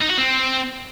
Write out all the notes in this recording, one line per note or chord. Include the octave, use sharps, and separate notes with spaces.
D#4
F#4
C4